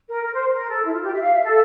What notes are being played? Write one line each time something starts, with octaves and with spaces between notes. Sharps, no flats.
A#4
A#4
C5
A#4
A4
E4
F4
G4
E5
F5
E5
A4